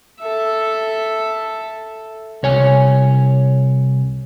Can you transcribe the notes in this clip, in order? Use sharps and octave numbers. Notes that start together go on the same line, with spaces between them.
A4 E5
C2 C#5 G#5